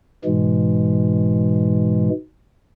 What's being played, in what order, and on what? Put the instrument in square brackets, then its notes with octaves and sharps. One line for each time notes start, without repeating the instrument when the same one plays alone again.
[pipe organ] G#2 B2 E3 G#3